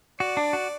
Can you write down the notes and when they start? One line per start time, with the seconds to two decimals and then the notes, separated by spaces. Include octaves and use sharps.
0.20 F#4 D5
0.37 D4
0.53 F#4